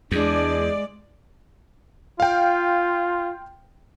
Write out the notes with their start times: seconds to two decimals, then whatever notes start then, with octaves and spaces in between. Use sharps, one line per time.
0.12 E2 G#3 D4 G#4 D5
2.20 F4 F5 G5